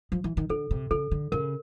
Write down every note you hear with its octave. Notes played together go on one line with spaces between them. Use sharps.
F3
E3
D#3
D3 A4
C3
C#3 A4
D3
C#3 A#4